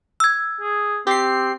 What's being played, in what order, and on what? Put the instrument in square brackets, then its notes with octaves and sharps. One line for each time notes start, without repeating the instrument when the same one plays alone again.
[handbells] E6 G#6
[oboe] G#4
[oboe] C4 [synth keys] G4 C7